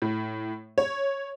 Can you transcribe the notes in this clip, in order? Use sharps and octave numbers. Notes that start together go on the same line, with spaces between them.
A2
C#5